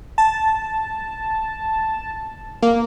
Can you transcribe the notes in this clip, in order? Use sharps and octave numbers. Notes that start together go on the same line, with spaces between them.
A5
A#3